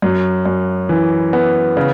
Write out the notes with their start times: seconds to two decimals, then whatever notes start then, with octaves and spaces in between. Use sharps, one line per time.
0.02 F#2
0.46 F#2
0.89 E3
1.33 B3
1.77 C#3